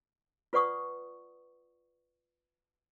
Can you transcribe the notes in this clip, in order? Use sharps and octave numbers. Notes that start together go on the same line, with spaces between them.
F4 B4 D5 F#5 C#6 D#6